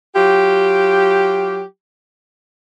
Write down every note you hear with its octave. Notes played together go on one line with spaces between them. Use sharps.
F#3 F4 G4